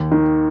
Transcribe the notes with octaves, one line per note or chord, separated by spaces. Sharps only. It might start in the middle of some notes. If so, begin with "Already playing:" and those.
Already playing: D#2
D#3